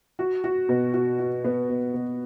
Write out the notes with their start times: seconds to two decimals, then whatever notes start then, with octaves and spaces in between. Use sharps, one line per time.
0.19 F#4
0.44 F#4
0.69 B2
0.94 F#4
1.19 F#4
1.44 B3
1.69 B2
1.94 B2